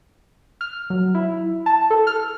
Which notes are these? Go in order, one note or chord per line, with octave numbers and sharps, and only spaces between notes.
F6
F#3
E4
A5
A4
F6